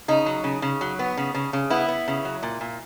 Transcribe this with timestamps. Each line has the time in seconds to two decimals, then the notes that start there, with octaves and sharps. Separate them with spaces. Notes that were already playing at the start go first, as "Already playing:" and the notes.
0.08 C#3 D#4
0.26 F#3
0.44 C#3
0.62 C#3
0.81 F#3
0.99 B3
1.17 C#3
1.34 C#3
1.53 C#3
1.70 B3 E4
1.88 B3
2.08 C#3
2.25 F#3
2.43 A#2
2.61 A#2